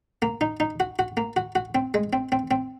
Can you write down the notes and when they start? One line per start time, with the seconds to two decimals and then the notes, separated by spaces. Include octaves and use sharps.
0.22 A#3
0.41 D#4
0.60 D#4
0.80 F#4
0.99 F#4
1.17 A#3
1.36 F#4
1.55 F#4
1.75 C4
1.94 G#3
2.13 C4
2.32 C4
2.51 C4